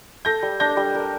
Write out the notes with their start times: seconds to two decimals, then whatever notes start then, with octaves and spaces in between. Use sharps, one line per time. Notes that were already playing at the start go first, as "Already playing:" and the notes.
0.25 A4 G6 A#6
0.43 G3
0.60 D4 G6 A#6
0.77 G3
0.95 A#4